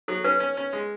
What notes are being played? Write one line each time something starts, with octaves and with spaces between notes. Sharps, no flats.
F#3 A4
C#4 B4
C#4
C#4
G#3